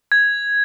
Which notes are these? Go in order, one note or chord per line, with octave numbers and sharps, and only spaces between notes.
G#6